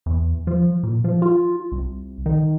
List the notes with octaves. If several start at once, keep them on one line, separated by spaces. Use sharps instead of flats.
E2
F3
A#2
F3
F4
C2
D#3